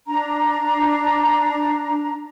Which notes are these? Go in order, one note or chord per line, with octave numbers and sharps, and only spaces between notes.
D4 A#5